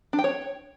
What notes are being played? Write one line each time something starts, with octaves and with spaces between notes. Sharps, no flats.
D4
G5
C#5